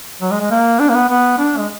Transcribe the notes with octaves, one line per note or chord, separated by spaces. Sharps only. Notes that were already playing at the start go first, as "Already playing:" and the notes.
F#3
G#3
G#3
A#3
D4
A#3
B3
B3
D4
G#3